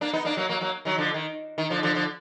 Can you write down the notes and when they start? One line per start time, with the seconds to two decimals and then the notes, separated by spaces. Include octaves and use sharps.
0.01 A#3 D4
0.13 B3 D#4
0.25 A#3 D4
0.37 F#3 A#3
0.49 F#3 A#3
0.61 F#3 A#3
0.85 D#3 F#3
0.98 D3 F3
1.14 D#3
1.58 D#3
1.70 D3 F3
1.83 D3 F3
1.95 D3 F3